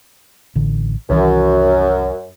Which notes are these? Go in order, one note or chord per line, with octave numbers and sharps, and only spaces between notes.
A1 D3
C2 F#2 D#3 E3